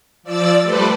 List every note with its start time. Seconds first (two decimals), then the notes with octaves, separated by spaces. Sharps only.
0.23 F3 D5 E6 A6
0.62 G3 A3 A4 B4 C5 D5